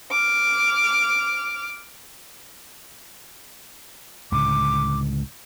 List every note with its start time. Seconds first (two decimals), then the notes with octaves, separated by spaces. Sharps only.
0.11 D6 F6
4.32 C#2 A2 D3 D6